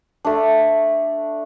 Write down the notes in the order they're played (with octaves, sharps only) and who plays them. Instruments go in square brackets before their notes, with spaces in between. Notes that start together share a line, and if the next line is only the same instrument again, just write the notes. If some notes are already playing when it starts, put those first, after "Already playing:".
[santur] A3 D4